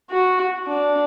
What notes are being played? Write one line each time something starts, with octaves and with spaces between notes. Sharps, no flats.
F#4
D4